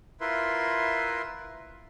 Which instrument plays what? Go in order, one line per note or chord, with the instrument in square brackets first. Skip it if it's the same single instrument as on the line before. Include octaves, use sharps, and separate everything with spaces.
[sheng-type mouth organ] E4 F4 A#4 B4 E5 C6